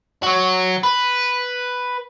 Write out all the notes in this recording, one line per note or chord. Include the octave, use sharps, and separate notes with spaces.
F#4 C#5
B4